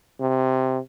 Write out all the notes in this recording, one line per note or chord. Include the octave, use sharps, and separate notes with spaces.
C3